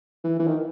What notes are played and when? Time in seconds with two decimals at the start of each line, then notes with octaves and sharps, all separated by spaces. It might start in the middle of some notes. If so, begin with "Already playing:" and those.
0.24 E3
0.39 E3
0.47 D#3